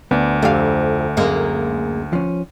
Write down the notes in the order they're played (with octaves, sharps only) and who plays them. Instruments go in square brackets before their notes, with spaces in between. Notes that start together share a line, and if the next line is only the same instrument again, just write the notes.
[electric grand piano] D2 [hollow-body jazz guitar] B3 C#4 D4
[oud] F2 F5 [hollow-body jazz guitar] A3 D4 G4
[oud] F#2 G#3 A#3
[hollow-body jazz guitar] F3 C#4